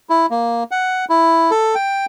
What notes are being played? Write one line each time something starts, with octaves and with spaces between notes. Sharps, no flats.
E4
A#3
F#5
E4
A4
G5